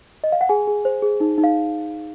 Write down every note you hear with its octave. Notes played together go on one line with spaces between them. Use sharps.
D#5
F5
F#5
G#4 G#5
G#4
C5
G#4
D#4
D#4
F5